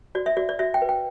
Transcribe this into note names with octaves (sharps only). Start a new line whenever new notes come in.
F#4 D5
E5
F#4 D5
D5
F#4 E5
G5
B4
G5